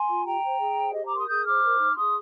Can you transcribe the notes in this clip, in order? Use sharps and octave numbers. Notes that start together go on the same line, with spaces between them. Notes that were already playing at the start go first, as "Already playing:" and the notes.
Already playing: G#5 C6
F4
G4 G5 A#5
C5
G#4
C5
G4 D#5
A#4 A#5 D6
C6 D#6
G#4 D#6 G6
C5 D6 F6
A#4
D#4
G#4 C6 D#6